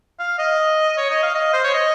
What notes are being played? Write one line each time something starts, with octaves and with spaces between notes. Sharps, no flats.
F5
D#5
C#5
D#5
F5
D#5
C5
C#5
D#5